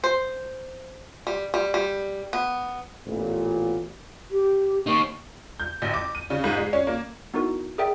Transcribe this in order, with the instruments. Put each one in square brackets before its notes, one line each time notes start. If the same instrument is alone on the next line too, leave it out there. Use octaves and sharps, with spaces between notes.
[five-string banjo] C5
G3
G3
G3
B3
[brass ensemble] A1 A#2 B3
[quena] G4
[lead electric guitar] A#3 D#4 [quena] C#6
[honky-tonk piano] G6
A1
D6
D#7
C#3
G#2
G#3
C#4
A#3
[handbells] B3 D#4 E4 F#4 A#4
G#4 A#4 D5 E5 G5